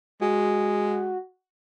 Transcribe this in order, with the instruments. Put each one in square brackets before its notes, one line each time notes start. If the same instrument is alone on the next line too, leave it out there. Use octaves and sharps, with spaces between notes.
[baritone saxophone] G#3 [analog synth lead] F#4